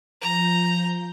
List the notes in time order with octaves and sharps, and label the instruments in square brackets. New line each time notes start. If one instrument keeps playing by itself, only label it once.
[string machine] F3 G6 [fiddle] A#5